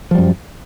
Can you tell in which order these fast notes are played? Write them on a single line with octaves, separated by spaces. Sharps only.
F3 G3 F#2